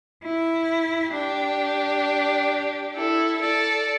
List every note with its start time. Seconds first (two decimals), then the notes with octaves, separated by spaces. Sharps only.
0.21 E4
1.13 D4 G4
2.96 E4 A4
3.42 A4 D5